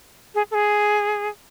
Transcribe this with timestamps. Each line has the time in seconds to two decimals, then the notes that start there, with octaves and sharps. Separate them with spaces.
0.35 G#4
0.51 A4
0.54 G#4